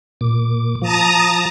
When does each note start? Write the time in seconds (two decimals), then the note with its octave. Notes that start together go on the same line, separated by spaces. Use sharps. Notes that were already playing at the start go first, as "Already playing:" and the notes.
0.21 A#2 D6
0.82 F3 A5 A#5 D#6